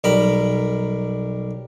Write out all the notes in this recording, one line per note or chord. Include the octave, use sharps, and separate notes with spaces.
B1 G3 A#4 B5